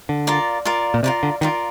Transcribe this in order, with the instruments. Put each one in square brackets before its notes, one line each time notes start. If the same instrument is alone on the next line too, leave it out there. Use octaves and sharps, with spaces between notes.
[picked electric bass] D3
[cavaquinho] F4 A#4 D5
F4 A#4 D5
[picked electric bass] A#2
[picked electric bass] C3 [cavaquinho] F4 A#4 D5
[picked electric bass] D3
[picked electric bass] D#3 [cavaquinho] F4 A#4 D5